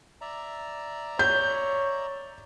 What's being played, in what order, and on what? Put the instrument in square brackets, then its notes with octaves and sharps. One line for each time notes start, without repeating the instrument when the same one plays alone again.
[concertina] D5 E5 A#5
[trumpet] C#5 [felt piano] G6